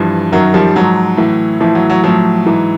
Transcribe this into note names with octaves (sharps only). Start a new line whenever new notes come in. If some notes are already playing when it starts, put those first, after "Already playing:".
Already playing: G2 E3 F3
F#2 D#3 F#3
F3 G3
G#2 F3 F#3
A2 E3
A2 E3 F3
F#3
F#3
A2 F3 F#3
G#2 E3